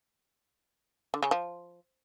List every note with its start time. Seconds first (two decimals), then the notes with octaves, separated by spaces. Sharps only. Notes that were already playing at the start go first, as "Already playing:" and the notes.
1.14 D3
1.23 C#3
1.31 F3